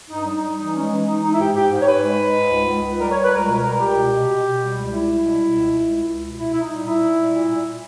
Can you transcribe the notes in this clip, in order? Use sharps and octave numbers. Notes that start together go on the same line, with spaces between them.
G2 D#4
G3
D#4
G3
E3 D#4
G#3 C#4
E3
E3 D#4
G#3 D#4
E4
G#2 G4
G#2 G4
G#2
C#5
G#2 B4
G#3
G#3
G#2
C#2
C#2
C#2
G3 A#4
G3 C#5
B4
C#2 A#4
B2 A#4
G3 A#4
C#2 G4
B2
B2
B2
B2
G3
C#2
G3 E4
G3
B2
B2
C#2
C#2
C#2
C#2
B2
A#2 E4
A#2 E4
D#4
G3
A#2 E4
A#2
G3
A#2
A#2
A#2